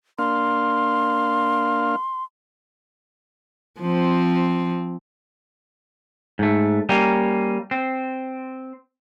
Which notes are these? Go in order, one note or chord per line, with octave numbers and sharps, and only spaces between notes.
A#3 D4 F5 C6
F3 C4
G#2 A3
G3 A#3 C#4
C4